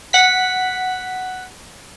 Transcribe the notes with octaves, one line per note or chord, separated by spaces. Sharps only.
F#5 B6